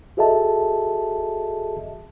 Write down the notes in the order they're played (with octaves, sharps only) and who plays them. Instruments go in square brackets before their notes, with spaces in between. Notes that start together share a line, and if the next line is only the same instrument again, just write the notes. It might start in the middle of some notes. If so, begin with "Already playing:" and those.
[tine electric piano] F#4 G#4 A4 D#5 E5 A5